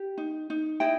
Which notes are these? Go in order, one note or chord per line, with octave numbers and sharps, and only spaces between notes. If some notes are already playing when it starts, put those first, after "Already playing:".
Already playing: G4
D#4
D#4
E4 D#5 G5